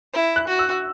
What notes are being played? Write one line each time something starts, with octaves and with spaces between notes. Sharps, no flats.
E4
F#6
F#4
E6